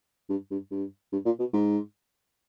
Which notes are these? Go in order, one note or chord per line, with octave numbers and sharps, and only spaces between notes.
G2
G2
G2
G2
A#2
B2
G#2